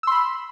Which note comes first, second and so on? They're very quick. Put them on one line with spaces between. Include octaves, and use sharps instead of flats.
E6 C6 B5